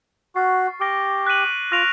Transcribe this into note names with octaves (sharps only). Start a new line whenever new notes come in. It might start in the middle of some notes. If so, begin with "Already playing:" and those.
F#4 C#6 F6 A6 C7
G4 D6 F6 A#6 D7 G7
F#6 B6 D#7 F#7
F4 C#6 F6 A#6 D7 F7